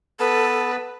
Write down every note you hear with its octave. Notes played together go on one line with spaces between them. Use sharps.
B3 A4 B4 A5